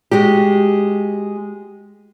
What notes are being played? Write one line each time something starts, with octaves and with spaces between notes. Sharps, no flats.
G#3 F#4 G4